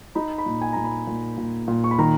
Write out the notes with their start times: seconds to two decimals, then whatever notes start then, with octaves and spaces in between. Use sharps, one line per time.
0.15 D#4 B5
0.38 B5
0.46 A#2
0.62 G#5
0.73 A#2 A#5
0.84 B5
1.07 A#2
1.38 A#2
1.68 A#2
1.84 C#6
1.91 B5
1.99 D#3 A#5